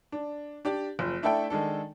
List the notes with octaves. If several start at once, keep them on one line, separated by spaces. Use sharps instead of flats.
D4
D4 G4 D5
F#1 F3
A3 D4 E4 A4 E5 G5
D#3 G#3 D4 A4